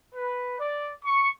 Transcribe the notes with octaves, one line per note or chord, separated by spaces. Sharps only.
B4
D5
C#6